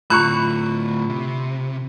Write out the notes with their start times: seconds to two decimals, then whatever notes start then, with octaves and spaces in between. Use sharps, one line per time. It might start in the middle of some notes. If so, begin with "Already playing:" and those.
0.10 D2 A2 F4 B5 C#6 F#6
1.09 C3